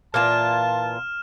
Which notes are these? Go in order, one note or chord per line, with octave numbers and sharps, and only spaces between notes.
A#2 E3 F4 A5 F6 E7